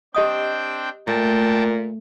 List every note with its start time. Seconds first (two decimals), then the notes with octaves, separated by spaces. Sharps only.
0.15 C4 D4 G4 D#5 G5 D#6
1.07 A#2 A3 G5 A5